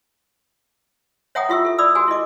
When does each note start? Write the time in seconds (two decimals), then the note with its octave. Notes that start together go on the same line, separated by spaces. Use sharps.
1.35 C#5 E5 F#5 G5 A#5 D#6
1.49 E4 F4 E5 C#6 E6
1.65 A4 E5
1.78 D5 B5 D#6 E6
1.95 F#4 A#4 G#5 E6
2.08 E4 A4 D#5 D6